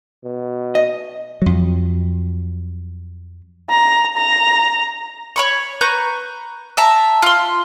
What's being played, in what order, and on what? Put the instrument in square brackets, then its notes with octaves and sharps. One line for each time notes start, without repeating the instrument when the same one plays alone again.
[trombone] B2
[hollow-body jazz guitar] D#5
[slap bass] F2 F#3
[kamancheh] A#5
A#5
[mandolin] C#5 B5 C#6
B4 A#5 C#6 G6
E5 A5 A#5
F4 C6